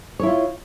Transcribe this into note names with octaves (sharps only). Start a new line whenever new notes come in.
E4 F4 C#5